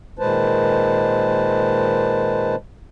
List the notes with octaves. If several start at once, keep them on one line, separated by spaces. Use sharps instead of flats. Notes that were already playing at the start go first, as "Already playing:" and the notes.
A#2 D#3 G#3 B4 C5 A5